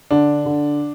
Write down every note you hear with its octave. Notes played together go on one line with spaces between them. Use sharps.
D3 D4
D3